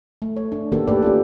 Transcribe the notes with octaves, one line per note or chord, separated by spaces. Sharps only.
A3
C#5
D4
D#3 A#3 B3 F#4 G4 A4
A3 A#3 G4 A4 B4 D5
C#4 F4 G4